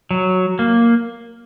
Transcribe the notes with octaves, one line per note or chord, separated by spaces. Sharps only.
F#3
A#3